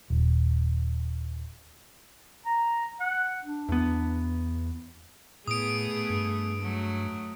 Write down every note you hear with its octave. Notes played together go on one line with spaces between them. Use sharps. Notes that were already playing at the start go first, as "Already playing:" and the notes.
D#1
A#5
F#5
D4
E2 B3
A2 A3 B3 G#4 D#6 D7
G2
F#3 A3